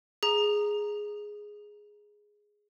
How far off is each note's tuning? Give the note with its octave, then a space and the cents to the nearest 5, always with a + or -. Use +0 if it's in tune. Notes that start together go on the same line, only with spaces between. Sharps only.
G#4 +0 A#5 +0